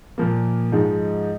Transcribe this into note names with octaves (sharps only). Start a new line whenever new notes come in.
A#2 F3 A#3
G#2 F3 G#3 D#4